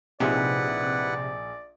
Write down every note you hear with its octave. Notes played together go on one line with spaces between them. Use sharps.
A#1 C3 D#4 E4 G#4 B4 D5 F#5